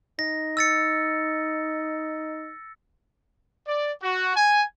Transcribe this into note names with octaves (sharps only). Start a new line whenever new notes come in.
D#4 A#6
E6 A6 C#7
D5
F#4
G#5